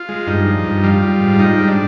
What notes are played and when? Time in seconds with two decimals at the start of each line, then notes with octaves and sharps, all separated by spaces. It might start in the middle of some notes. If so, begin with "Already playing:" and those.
Already playing: F4
0.09 G#3
0.27 G2 D#4
0.46 F3
0.64 G2
0.83 G3 F4
1.02 G3
1.21 G#2
1.39 G#2 D#4
1.58 G3
1.68 D4